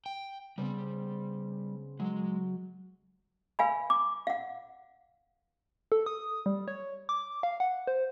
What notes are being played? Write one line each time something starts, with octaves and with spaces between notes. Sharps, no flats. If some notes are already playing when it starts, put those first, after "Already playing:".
G5
C#3 G3 B3 C4
F#3 G#3
B4 F5 G#5 B5
D6
F5 F#5
A4
D#6
G3
C#5
D6
F5
F#5
C5